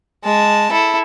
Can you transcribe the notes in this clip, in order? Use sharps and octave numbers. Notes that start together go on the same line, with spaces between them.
G#3 A5
E4 A4